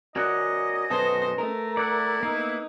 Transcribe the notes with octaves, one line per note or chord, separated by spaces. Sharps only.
C#4 F#4 A#4 D5 D#5 F#5
F#2 B2 A4 B4 C5
A3 A#4
E4 D5 F#5
A#3 B3 D#4